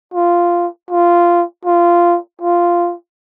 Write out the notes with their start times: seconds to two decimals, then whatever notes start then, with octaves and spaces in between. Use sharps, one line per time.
0.14 F4
0.91 F4
1.65 F4
2.41 F4